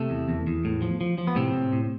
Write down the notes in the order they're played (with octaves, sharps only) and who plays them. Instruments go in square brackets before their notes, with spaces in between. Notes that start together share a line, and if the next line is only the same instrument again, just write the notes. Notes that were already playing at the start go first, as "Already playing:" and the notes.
Already playing: [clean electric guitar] C3 A3
E2
E2
E2
A2
F3
F3
F3
B3
A2 C3 C4
A2
A2